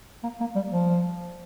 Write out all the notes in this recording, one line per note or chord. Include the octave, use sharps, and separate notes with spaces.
A#3
A#3
G3
F3